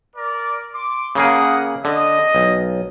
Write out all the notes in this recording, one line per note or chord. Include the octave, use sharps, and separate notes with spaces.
A#4 D5
C6 D6
C#3 A#3 G#4 A#4 F#5 D#6
D3 D#5
B1